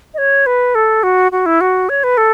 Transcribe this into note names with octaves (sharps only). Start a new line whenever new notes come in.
D#5
C#5
B4
A4
F#4
F#4
E4
F#4
C#5
B4
A4